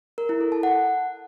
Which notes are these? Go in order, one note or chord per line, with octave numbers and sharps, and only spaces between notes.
A#4
E4
A4
A5
F#5